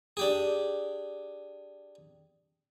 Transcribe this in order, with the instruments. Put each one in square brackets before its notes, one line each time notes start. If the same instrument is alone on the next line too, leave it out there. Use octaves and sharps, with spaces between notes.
[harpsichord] D4 G4 G#4